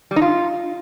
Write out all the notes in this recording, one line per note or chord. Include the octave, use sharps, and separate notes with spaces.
G3
D#4
F4